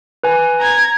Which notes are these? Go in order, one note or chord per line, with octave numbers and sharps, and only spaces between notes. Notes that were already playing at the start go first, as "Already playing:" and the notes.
B4 G#5
A#5 G#6